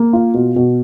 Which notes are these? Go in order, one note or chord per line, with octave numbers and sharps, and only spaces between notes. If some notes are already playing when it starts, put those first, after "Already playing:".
Already playing: A#3
F4
B2
B2